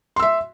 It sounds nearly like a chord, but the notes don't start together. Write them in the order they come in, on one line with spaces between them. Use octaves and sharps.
C6 E6 E5